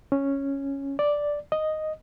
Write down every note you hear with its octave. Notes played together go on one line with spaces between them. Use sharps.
C#4
D5
D#5